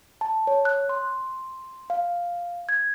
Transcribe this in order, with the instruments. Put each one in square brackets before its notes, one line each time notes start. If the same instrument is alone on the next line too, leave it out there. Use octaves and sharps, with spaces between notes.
[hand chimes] A5
C#5
F#6
C6
F5
G#6